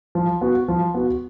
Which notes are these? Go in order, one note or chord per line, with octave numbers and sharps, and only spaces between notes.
F3
B3 F#4
F3
B3 F#4